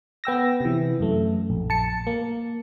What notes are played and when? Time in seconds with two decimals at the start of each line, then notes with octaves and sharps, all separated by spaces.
0.24 B3 G5 E6 A#6
0.61 C3 E3
1.00 F#2 A3
1.50 A#1
1.70 A5 C#7
2.07 A#3